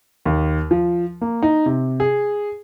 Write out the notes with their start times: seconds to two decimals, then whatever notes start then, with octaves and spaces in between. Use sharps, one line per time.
0.25 D#2
0.71 F3
1.21 A#3
1.42 D#4
1.66 C3
2.00 G#4